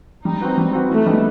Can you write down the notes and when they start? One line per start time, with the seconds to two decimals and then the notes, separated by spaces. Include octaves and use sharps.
0.25 G3 D#4
0.41 C4 F#4 B4
0.58 G3
0.73 C4 F#4 B4
0.89 E3 A3
1.06 G3 B3 D#4